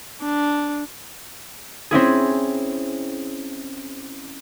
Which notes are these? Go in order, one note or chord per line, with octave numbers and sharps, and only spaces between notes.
D4
C4 C#4 E4 G#4